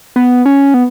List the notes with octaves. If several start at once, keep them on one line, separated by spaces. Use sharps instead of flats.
B3
C#4
B3